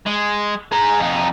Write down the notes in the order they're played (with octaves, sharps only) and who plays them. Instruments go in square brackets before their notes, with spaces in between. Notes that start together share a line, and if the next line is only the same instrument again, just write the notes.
[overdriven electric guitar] G#3
G#4 A#5
F2 D#4